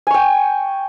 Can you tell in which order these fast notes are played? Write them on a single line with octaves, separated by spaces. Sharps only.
G#5 C#6 G5